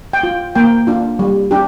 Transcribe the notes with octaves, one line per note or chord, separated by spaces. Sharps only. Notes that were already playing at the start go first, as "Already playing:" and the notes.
G5
F4
A#3 G5
D4 F4
G3
D4 G4